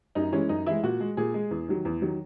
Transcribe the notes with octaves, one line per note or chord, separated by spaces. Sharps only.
F#2 D#4
E3 G#3 C#4
F#2 D#4
E3 G#3 E4
A#2 F#4
G#3
A#2 G#4
G#3
E2
D#3 F#3
E2
D#3 F#3